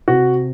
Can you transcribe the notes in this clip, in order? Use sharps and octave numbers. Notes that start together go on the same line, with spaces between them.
C3 F#4